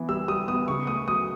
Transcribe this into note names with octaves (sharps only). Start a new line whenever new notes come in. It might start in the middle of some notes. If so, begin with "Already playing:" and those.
Already playing: E3 B3
G3 E6
G3 D#6
B3 D#6
C#3 C#6
A3 D#6
F#3 D#6